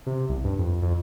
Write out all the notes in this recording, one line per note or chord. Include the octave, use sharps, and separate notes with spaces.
C3
C2
G2
F2
F2